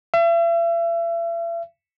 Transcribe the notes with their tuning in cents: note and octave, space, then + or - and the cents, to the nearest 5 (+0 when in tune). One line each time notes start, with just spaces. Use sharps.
E5 +40